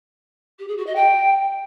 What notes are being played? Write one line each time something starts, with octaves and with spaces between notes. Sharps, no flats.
G4
G#4
F#4
D#5
G5